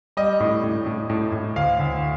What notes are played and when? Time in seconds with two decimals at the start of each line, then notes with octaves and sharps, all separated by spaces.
0.17 G3 D#5
0.40 A2
0.63 A2
0.86 A2
1.10 A2
1.32 A2
1.56 D2 F5
1.80 D2